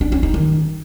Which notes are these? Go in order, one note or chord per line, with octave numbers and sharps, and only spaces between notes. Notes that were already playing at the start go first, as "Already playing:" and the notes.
D4
C#4
D#4
D#3